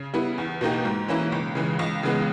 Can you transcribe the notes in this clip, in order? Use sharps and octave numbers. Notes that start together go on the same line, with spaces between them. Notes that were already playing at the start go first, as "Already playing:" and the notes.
Already playing: C#3
G3 B3 E4
E2
B2 A#3 D#4 G4
G#2
E3 A#3 C#4 E4
C#2
C#3 E3 G#3
C#2
C#3 E3 G#3 B3